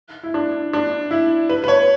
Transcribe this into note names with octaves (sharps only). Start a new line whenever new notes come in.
E4
D4
D4
E4
B4
B4
C#5